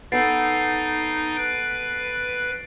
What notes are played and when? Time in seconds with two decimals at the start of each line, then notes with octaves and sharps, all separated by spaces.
0.12 B3 D#4 A4 A6 C7 D7
1.37 B4 D7